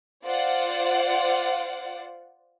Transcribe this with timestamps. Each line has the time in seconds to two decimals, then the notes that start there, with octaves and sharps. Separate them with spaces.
0.24 F4 C5 D5 F#5